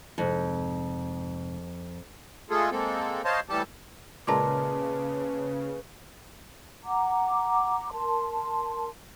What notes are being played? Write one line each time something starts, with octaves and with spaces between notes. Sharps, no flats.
F1 F2 G#2 C3
G#3 A3 F4 G#4 A4
G#3 A#3 C4 A4
C5 C#5 D#5 F5 A5 C6
A2 E3 G3 G4 A4 A5
A#2 C#3 G#3 A#4 B4 A5 C6 D6
F#5 A#5 D6
A#4 A5 C6